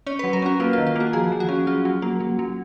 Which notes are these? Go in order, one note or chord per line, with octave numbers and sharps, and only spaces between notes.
C#4 C#5
F#3 B4
A#4
C#4 F#4
A#3 F4
F4
D#3
F4
A#3 F#4
F3 G#4
F3
F#4
C#4
F#3 F4
F#3
A#3
F#3
F#3